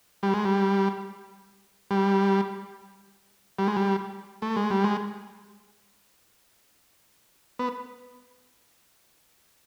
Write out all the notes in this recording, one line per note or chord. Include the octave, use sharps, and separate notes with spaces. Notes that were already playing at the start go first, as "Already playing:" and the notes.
G3
G#3
G3
G3
G3
G#3
G3
A3
G#3
G3
G#3
B3